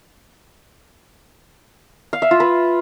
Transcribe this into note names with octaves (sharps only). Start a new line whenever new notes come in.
F5
E5
F4
B4